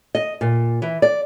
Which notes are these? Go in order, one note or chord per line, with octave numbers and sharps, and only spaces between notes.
D#5
A#2
E3
D5